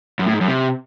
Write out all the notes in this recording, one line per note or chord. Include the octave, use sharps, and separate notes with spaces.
F#2
A2
G#2
F#2
C3